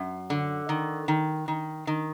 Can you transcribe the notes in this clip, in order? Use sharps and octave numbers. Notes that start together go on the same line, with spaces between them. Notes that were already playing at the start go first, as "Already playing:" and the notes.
Already playing: F#2
D3
D#3
D#3
D#3
D#3